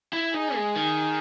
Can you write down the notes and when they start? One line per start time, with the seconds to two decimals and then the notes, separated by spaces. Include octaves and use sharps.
0.13 E4
0.34 D#4 G#4
0.56 G#3
0.76 D#3